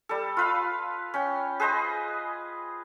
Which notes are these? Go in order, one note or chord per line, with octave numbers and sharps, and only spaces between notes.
G3 A4
F4 B4 F5
C#4 G5
G#4 B4 C5 D#5